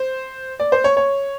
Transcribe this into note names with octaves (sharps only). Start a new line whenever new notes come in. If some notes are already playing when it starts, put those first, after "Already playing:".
Already playing: C5
D5
C5
C#5
C#5